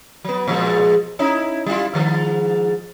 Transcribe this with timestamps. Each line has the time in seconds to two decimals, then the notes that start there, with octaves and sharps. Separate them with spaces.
0.24 F#3 B3
0.48 A#2 F3 G#3
1.19 C#4 D#4 E4
1.66 G3 E4 F4
1.94 G#2 D#3 F3